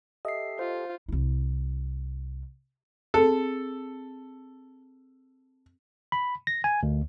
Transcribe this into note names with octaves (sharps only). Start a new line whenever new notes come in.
G4 A4 D#5 E5 C7
F4 C5
C2 E4
C4 G#4 A4
B5
A#6
G#5
D2